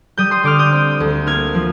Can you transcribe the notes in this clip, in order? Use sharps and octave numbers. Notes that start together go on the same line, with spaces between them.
G3 D#6 G6
C6 D#6
D3 D6 F6
D#6 G6
C4
D2
A#3 F6 G#6
F3